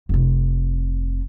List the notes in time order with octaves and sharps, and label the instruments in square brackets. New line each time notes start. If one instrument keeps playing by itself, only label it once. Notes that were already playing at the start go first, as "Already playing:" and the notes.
[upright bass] F1 C3